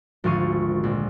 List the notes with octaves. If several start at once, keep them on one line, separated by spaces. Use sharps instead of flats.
G#1 D2 F3 F5 C#6 D#7
A#1